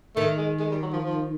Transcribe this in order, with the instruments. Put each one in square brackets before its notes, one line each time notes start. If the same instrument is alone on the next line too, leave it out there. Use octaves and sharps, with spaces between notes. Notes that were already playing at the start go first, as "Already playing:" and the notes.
[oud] D#3 [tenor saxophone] A3
[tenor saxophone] G#3
G#3
G3
F#3
F3
F3